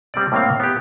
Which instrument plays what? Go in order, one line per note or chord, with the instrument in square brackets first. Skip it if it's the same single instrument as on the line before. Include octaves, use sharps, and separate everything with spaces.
[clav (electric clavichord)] G3 C4 D5
A2 A#3 C4 F5
B3 G4